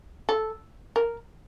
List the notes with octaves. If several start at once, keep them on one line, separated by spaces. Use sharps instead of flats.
A4
A#4